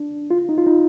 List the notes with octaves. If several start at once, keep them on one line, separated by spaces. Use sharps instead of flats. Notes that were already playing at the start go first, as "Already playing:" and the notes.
Already playing: D4
F4
D#4
F4
D#4